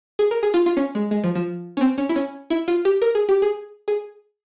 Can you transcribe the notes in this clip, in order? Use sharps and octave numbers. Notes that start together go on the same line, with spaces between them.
G#4
A#4
G#4
F4
F4
C#4
G#3
G#3
F3
F3
C#4
C4
C#4
E4
C#4
E4
F4
G4
A#4
G#4
G4
G#4
G#4